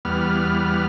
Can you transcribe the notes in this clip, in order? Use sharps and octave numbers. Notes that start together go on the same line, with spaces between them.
E2 G3 B3 F6